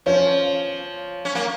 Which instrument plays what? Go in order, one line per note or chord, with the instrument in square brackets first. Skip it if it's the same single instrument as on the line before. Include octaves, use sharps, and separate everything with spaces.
[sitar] F3 [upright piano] C#4
[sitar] C#4
A#3